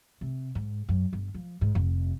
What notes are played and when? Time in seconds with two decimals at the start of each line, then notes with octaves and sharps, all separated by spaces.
0.21 C3
0.55 G#2
0.89 F#2
1.13 G1
1.34 F3
1.61 G#2
1.75 F1